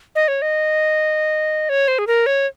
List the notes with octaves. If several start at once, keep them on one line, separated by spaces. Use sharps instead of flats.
D#5
C#5
D#5
C#5
C5
G#4
A#4
C#5